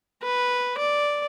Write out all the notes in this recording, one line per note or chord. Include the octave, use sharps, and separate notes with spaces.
B4
D5